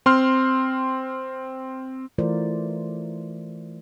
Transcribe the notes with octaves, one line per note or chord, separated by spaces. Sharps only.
C4 C6 F6
E3 A3 F4 A#4 C5 D5